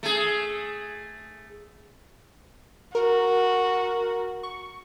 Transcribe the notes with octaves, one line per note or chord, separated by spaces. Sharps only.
A3 G#4
F#4 A#4
C#6